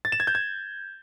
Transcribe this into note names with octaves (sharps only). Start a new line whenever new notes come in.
A6
E7
G#6
G6
G#6